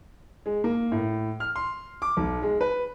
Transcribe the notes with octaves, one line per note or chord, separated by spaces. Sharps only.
G#3
A#3
A2
F6
C6
D6
B1
G#3
B4